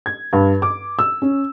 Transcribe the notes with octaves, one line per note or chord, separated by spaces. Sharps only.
G#6
G2
D6
E6
C#4